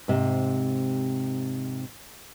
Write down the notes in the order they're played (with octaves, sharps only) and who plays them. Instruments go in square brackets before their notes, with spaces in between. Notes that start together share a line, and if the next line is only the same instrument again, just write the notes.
[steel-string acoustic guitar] G#2 C3